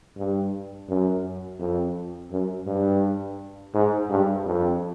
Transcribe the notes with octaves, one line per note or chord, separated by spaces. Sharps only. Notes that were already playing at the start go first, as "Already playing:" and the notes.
G2
F#2
F2
F#2
G2
G#2
G2
F2